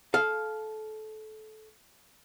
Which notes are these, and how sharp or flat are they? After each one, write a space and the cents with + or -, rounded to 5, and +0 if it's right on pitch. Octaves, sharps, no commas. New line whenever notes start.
A4 -20 F5 +0